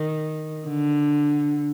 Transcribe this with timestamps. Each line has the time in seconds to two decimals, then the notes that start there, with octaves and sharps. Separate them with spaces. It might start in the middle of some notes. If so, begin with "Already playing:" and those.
Already playing: D#3
0.68 D3